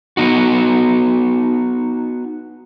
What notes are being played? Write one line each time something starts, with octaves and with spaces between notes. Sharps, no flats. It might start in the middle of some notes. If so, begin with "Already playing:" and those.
B3 D#4 F#4